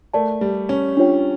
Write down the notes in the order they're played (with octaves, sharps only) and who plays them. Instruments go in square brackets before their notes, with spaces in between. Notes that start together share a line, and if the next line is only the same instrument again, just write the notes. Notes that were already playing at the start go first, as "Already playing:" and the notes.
[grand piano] A3 [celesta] A#4 D5 A5
[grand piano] G3
C#4
[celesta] D4 F4 C#5 G5